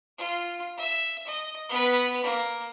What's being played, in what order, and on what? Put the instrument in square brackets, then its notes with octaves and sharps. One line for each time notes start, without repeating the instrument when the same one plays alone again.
[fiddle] F4
E5
D#5
B3 B4
A#3